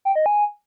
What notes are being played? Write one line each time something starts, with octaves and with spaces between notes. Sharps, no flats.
G5
D#5
G#5